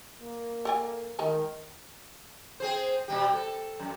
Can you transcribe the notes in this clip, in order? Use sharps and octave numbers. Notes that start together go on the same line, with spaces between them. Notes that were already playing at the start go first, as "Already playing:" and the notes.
A#3
A4 D5 G#5
D#3 G#3 D#4 A#4
C4 G#4 C5
B2 G3 G4
A4
F#2